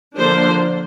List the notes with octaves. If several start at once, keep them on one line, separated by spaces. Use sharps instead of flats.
D3 F3 A#3 D4 C5